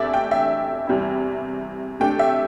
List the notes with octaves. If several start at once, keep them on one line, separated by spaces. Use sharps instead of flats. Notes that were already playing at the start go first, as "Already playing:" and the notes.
Already playing: E2 C3 A3 D4 D5 E5
G5
E5
E2 C3 G3 E4
C3 A3 D4 G5
E5